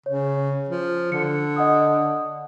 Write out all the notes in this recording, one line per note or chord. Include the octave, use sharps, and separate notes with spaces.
C#3 C#5
F3
D3 C#7
D#5 F#5 D#6